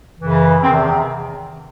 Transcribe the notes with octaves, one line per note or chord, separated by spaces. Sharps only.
F#2 C#3 E3
E2 C3 D#3 C4